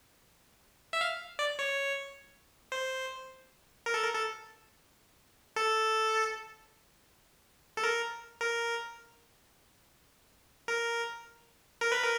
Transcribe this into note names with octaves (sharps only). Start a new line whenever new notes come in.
E5
F5
D5
C#5
C5
A#4
A4
A#4
A4
A4
A4
A#4
A#4
A#4
A#4
B4
A#4